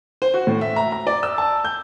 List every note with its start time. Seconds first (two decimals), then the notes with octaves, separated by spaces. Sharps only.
0.22 C5
0.34 F#4
0.47 A2
0.61 E5
0.76 A#5
0.92 A#5
1.07 D5
1.23 E6
1.38 A5
1.65 G6